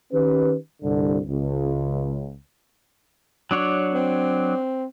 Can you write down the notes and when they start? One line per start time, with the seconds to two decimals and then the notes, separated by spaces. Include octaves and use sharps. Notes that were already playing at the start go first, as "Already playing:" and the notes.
0.12 D#3 C#4 G4 B4
0.83 C2 G2 D3
1.26 C#2
3.51 F#3 D4 C#5
3.93 C4